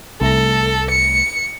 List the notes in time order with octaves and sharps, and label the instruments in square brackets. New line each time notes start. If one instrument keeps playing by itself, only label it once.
[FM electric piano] C2 A3 A#6 [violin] A4
[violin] C#7